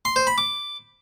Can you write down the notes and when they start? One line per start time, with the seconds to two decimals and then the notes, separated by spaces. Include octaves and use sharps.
0.05 C6
0.16 C5
0.27 B5
0.38 D6